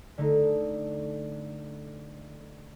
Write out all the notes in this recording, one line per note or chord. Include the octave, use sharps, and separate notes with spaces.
D3 A3 D#4